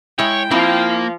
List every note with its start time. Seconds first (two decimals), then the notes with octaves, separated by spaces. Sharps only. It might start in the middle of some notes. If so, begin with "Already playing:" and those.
0.19 G#3 E4 C#5 G5
0.51 F3 A#3 C4 E4 A#5